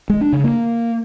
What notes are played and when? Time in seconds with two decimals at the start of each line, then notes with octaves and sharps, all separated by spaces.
0.10 G#3
0.21 D4
0.33 C#3
0.44 A#3